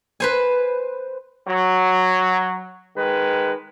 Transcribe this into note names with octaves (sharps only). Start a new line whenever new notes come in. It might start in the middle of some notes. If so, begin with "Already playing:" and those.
B4 C5 G#5
F#3
D#3 G#3 B4